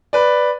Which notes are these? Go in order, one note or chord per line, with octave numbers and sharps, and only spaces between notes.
B4 D5